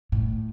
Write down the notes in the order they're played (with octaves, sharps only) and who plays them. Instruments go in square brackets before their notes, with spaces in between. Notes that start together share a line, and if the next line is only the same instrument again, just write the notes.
[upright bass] A2